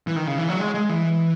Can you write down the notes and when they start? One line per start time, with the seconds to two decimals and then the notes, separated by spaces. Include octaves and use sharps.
0.07 E3
0.16 D#3
0.27 C#3
0.38 E3
0.49 F#3
0.60 G#3
0.74 G#3
0.89 E3